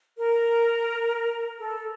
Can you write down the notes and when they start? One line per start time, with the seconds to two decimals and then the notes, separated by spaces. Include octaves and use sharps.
0.16 A#4
1.59 A4